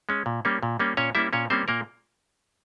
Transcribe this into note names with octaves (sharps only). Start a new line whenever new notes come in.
G#3 C#4
A#2
G3 A#3 C#4
A#2
G3 A#3 C#4
A#2 C#4 C#5
G3 A#3 C#4 E4 E5
A#2 C#4 C#5
G3 A#3 C4 C#4 C5
A#2 A#3 A#4